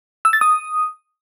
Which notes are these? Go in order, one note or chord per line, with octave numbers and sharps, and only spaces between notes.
E6
A6
D#6